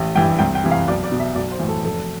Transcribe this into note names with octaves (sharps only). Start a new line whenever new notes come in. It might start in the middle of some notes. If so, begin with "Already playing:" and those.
Already playing: A1
G2 E3 G5
C2 G5
G5
C3 E3
F5
B1 D5
D5
B2
E5
B1 D5
C5
A2 E3
A4
F1 A4